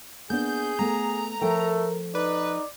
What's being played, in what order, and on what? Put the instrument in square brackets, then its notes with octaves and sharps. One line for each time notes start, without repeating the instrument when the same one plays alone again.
[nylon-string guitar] A#3 B3 D4 [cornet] G#4 [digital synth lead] G6
[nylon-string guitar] A3 B3 [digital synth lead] A#5
[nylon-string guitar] F3 A4 G5 [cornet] A3 [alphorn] A#4
[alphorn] D#4 [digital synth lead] B4 [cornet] D5